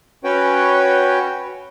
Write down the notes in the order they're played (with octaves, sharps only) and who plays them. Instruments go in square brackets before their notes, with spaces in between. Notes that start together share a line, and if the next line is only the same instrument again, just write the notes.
[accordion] C#4 F#4 B4 C#5 G5